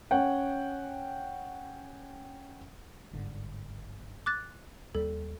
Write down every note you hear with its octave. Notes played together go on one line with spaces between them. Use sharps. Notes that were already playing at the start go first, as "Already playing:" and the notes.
C#4 C#5 F#5 G5
G1 G#2 D3
D6 F#6 A6
D#2 G3 A4